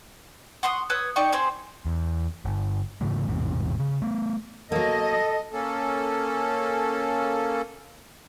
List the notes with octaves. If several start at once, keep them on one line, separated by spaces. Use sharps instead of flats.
F#5 C6 C#6 D#6
B4 C#5 D#6 E6
D#4 D5 G5 C#6
C4 G4 G#4 C5
E2
G1
G#2 C#3 E3 A3
A1 E2 G#2 C3
C#3
A3 B3
F#3 A#3 A4 D#5
A#3 C#4 A4